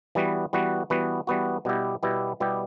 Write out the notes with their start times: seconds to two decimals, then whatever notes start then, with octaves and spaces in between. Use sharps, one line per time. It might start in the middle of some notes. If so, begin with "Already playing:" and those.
0.15 E3 G3 B3 F#4
0.53 E3 G3 B3 F#4
0.90 E3 G3 B3 F#4
1.27 E3 G3 B3 F#4
1.65 B2 G3 B3 E4 G4
2.03 B2 G3 B3 E4 G4
2.40 B2 G3 B3 E4 G4